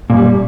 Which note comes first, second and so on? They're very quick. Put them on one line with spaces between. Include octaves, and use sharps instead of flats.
A#2 F#2 G3